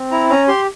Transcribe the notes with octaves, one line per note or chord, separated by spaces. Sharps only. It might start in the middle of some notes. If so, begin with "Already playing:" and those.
Already playing: C4
E4 A#5
C#4 A#5
G4 C6